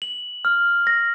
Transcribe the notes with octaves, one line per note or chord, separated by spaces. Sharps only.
F#7
F6
A#6